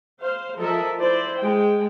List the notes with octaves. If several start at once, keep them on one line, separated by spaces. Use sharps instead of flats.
C5 F5
F3 A4 A#4 D#5 E5
E4 C5 D5
G#3 G5